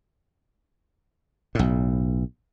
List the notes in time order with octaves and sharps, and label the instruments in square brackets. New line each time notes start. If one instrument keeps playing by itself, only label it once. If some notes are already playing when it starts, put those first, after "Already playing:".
[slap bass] B1 A2